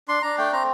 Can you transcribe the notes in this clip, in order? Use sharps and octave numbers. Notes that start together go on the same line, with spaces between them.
D4 C6
D4 A#5
A3 G5
C4 A#5